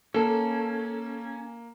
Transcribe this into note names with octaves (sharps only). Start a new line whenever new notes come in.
A#3 C#4 A4